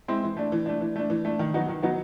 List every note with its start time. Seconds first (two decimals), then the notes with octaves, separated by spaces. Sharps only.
0.08 G#3 C4 E4
0.23 E3
0.37 A3 D4
0.52 E3
0.66 A3 D4
0.81 E3
0.96 A3 D4
1.10 E3
1.25 A3 D4
1.39 D#3
1.54 F#3 B3 D#4 F#4
1.69 D#3
1.82 F#3 B3 D#4 F#4